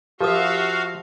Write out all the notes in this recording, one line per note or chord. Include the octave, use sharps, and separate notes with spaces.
F3 F#4 G4 A#4 E5 F5 D#6